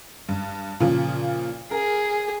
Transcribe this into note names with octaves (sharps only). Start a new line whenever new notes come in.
G2
A#2 C#3 F3
G#4 A#4